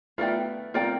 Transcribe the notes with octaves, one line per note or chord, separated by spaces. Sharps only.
A3 B3 F4 A#4 D5 G5
A#3 C4 F4 A#4 D5 G5